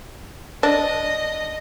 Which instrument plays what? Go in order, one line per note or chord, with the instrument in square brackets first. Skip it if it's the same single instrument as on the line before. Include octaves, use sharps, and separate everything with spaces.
[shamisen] D4 [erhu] D#5